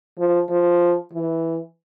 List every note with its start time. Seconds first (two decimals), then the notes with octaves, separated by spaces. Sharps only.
0.18 F3
0.50 F3
1.13 E3